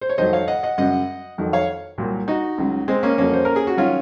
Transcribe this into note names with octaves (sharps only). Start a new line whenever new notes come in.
C5
C#5
F2 D#3 F#3 C5 D#5
C#5 F5
D#5 F#5
D#5 F#5
F#2 C#3 F#3 D#5 F#5
F2 D#3 F#3
C#5 F5
C2 A#2 F#3
D#4 F#4
C#2 C#3 F#3
G#3 C4
A#3 C#4
F2 C#3 F#3 A#3 C#4
C5
A#4
G#4
F#4
D#3 F#3 C#4 F4